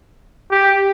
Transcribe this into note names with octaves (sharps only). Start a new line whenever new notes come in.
G4